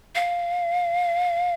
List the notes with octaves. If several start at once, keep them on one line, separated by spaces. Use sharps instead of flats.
F5